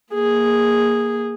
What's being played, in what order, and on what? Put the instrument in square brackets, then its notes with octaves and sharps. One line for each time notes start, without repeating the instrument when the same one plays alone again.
[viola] A#3 G#4